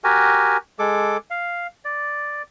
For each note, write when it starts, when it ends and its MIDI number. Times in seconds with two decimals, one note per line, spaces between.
0.04 0.57 66
0.04 0.57 67
0.04 0.57 70
0.04 0.57 80
0.79 1.17 56
0.79 1.17 69
0.79 1.17 86
1.31 1.67 77
1.85 2.42 74